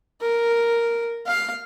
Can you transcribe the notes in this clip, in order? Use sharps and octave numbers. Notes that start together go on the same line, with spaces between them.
A#4
F5